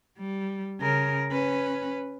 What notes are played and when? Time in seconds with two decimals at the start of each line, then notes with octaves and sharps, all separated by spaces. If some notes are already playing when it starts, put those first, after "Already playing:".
0.19 G3
0.80 C#3 A#4
1.31 C#4 B4